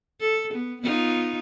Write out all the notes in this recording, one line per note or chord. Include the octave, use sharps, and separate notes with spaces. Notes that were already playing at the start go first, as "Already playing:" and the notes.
A4
B3
B3 D#4 F4